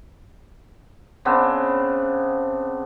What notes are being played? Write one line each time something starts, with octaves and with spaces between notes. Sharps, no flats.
C#3 B3 C4 D4